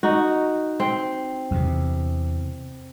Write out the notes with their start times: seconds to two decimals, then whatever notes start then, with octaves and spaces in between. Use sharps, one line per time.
0.03 D#4 F#4
0.80 C4
1.51 E2 C3